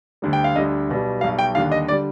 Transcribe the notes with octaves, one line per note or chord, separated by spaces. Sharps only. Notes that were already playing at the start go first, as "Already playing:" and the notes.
D2 D3 G3
G5
F5
D2 D3 G3 D#5
B1 B2 G3
B1 B2 G3 F5
G5
D#2 D3 G3 F5
D#5
D3 G3 D5